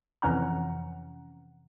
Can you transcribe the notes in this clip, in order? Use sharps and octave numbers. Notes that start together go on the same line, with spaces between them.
F2 C3 E3 C#4 F#5 A#5